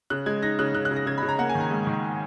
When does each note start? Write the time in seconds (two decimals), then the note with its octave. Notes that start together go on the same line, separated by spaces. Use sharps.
0.10 C#3 F#6
0.26 G#3 G#6
0.42 D#4 A#6
0.59 C#3 F#6
0.75 C#3 F#6
0.85 F#6
0.91 C#3
0.96 A#6
1.06 C#3 G#6
1.18 B5
1.23 C#3
1.28 A#5
1.39 A#3 F#5
1.49 G#5
1.55 D#3
1.60 A#5
1.71 G#2
1.87 D#3